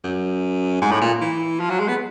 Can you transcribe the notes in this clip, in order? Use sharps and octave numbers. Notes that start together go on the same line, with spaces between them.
F#2
G#2
A2
A#2
E3
F3
F#3
G#3
B3